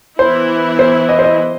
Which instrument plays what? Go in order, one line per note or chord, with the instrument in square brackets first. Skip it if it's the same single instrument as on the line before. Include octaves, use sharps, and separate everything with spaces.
[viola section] E3 B3 E4 [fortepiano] C5
[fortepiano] C5
D#5
C5
D#5